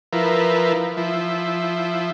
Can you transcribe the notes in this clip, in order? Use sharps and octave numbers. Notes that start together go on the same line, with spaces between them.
F3 E4 A#4 B4
F3 E4